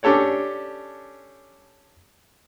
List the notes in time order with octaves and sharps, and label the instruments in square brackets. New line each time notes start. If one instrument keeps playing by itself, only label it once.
[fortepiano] C#4 D4 G4 A4 C#5 D5